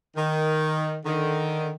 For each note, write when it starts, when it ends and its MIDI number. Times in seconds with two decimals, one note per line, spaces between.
0.17 0.97 51
1.05 1.71 50
1.05 1.71 51